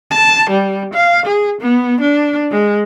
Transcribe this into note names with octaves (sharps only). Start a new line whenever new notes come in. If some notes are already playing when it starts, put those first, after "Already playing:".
A5
G3
F5
G#4
B3
D4
G#3